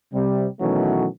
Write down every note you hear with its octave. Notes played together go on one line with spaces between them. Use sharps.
C3 G3
B2 D#3 E3 F#3 A3 C#4